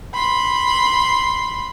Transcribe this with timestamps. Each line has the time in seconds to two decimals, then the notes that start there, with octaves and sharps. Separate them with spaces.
0.14 B5 C6